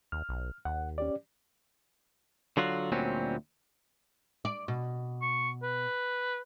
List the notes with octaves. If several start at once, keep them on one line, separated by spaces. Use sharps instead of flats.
D#2 F6
B1
D#2 F#5
C#4 G4 D5
D3 F#3 F4 F#4
D2 A#2 F#3 G3 C4 C#4
D5
B2
C#6
B4